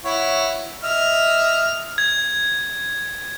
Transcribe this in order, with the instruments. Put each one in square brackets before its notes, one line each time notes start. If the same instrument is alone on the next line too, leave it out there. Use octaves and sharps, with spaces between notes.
[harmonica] E4 C#5 F#5
D#5 E5 F6
[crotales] G#6